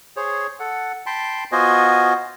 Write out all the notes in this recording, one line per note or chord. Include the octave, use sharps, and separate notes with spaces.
G#4 C5 C#5
A4 F#5
G5 A5 B5 C6
B3 F4 F#4 C5 D#5 G#5